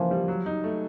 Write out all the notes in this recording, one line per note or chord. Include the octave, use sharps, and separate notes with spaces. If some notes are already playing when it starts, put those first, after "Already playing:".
Already playing: C#3 E3 F3 A#3
G3
F#3
D#4
A3